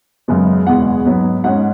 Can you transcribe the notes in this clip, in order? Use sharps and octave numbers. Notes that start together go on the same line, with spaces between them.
F#2 C#3 G#3 B3
E2 B2 G#3 B3 F#5
G#2 F#3 B3
G#2 G#3 C#4 F#5